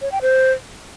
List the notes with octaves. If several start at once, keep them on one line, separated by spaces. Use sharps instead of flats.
C#5
G5
C5